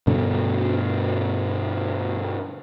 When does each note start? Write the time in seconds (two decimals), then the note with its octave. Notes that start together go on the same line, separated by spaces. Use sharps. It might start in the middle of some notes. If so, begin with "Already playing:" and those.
0.07 G2 B2 D3